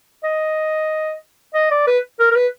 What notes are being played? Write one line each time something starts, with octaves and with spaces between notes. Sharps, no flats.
D#5
D#5
D5
B4
A#4
A#4
B4